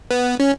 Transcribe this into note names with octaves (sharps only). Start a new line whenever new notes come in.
B3
C#4